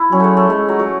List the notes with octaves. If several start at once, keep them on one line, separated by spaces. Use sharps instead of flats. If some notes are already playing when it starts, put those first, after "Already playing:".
Already playing: E4
F#3 C#4
G#3 A3
A3
G#3 A3
F#3
F#3